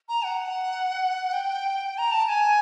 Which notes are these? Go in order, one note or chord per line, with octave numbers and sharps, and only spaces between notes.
A#5
F#5
G5
A#5
A5
A5
G#5